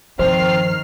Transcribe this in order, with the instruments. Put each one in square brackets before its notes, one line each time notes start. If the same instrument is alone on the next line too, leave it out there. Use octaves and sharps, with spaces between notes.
[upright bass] G2 F3 [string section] D#3 F6 C7 [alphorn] C4 [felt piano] C5